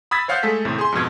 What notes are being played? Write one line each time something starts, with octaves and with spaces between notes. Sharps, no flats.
B5 D#6 E6 G#6 A6 B6
C5 C#5 F5 F#5 D#6 G6
G#3 A3 A4 B6
D#2 A2 C3
G#4 C6
F2 G#2 B2 G#6